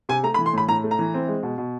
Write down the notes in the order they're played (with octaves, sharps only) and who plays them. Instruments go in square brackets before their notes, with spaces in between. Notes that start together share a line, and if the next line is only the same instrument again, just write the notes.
[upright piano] C3 G#5
A3 A#5
B5
E3
C6
A2 B5
A2 A#5
A3
A#5
E3
C4
G#3
B2
B2